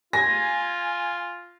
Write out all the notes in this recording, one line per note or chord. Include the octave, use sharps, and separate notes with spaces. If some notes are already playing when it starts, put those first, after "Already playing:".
F4 G#5 A#6